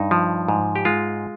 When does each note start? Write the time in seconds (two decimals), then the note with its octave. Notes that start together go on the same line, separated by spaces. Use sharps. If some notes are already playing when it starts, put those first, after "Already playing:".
Already playing: G2 D#4
0.11 F3
0.48 G#2
0.76 G4
0.85 G#3 F4